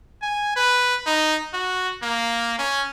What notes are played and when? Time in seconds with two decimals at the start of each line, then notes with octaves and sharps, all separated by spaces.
0.22 G#5
0.56 B4
1.06 D#4
1.54 F#4
2.03 A#3
2.59 C#4